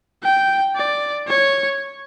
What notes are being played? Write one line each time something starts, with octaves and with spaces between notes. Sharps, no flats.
G5
D5
C#5